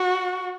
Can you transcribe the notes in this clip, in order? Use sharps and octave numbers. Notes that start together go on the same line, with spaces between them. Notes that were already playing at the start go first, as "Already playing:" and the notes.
Already playing: F#4